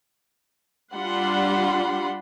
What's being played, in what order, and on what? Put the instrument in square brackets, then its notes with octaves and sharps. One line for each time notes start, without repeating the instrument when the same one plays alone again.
[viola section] G3 D4 F4 F#5 B5 C6